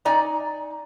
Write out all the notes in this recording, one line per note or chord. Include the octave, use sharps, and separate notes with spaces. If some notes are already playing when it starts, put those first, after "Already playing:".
D#4 D5 G#5 A#5